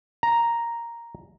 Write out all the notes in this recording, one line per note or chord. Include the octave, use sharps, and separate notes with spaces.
A#5